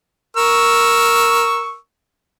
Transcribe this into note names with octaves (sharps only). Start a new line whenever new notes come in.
A#4 C#6 E6